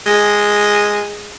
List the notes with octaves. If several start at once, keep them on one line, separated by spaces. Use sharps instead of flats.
G#3